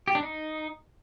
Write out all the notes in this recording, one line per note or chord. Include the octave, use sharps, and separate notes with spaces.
G4
D4
D#4